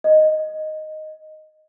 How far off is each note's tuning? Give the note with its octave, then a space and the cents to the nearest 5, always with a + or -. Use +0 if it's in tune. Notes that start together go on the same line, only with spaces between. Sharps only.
D#5 +0